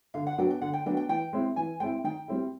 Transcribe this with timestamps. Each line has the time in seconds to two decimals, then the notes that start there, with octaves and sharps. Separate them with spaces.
0.14 D3 F5
0.27 F#5
0.38 F#3 B3 D4 F#4 G5
0.51 G5
0.62 D3 F#5
0.74 G5
0.86 F#3 B3 D4 F#4 G5
0.97 G5
1.09 E3 G5
1.33 G#3 C4 E4
1.56 E3 G#5
1.80 G#3 C4 E4 G5
2.04 D#3 G5
2.28 G3 C4 E4